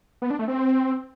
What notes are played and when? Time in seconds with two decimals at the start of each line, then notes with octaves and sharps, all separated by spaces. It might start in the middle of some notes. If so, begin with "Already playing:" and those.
0.22 B3
0.30 D4
0.39 A3
0.48 C4